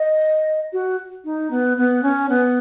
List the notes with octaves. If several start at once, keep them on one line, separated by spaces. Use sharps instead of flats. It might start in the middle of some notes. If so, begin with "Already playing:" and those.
Already playing: D#5
F#4
D#4
B3
B3
C#4
B3